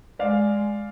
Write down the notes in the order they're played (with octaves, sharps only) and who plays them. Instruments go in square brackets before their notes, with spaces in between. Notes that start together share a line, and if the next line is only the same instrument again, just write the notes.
[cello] G#3 [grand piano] D5 F5